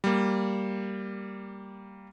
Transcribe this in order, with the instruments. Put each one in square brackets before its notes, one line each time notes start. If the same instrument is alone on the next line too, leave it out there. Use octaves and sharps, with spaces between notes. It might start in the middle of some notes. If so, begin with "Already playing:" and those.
[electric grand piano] G3 A#3